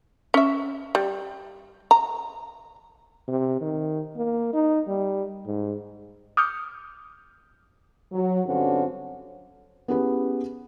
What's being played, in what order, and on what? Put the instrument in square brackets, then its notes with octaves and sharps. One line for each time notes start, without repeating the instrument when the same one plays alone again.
[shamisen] C#4 E5
G3
A#5
[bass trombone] C3
D#3
A#3
D#4
G3
G#2
[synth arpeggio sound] D6 D#6 F6 G6 C#7
[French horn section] F#3
G2 D3 C4 C#4 F#4
[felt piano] B3 C#4 E4 G4 G#4 B4